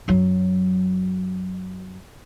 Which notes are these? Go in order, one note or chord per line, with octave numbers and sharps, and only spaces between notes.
F#2 F#3